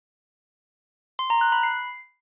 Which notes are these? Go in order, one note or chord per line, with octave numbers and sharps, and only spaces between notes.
C6
A#5
F#6
B5
C7